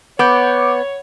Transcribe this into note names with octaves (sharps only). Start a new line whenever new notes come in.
B3 C#5 F#5 D6 G6